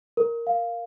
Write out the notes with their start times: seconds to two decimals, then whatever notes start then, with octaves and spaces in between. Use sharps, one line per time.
0.17 A#4
0.47 F5